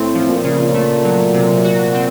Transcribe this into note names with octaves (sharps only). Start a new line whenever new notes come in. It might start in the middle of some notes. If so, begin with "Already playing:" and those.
Already playing: A2 C4
F3
A#2
C#3
A3
F#3
C3
F#4
C4